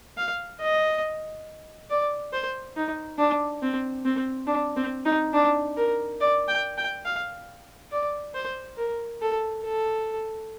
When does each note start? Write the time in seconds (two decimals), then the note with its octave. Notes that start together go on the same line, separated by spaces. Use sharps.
0.17 F5
0.61 D#5
1.90 D5
2.33 C5
2.76 D#4
3.18 D4
3.62 C4
4.05 C4
4.47 D4
4.77 C4
5.05 D#4
5.33 D4
5.77 A#4
6.20 D5
6.48 G5
6.78 G5
7.05 F5
7.91 D5
8.35 C5
8.78 A#4
9.21 A4
9.64 A4